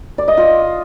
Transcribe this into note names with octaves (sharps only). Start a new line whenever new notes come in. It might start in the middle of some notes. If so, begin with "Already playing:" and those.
D5
D#5
F4